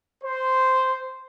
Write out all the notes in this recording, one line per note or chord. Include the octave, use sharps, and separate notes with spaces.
C5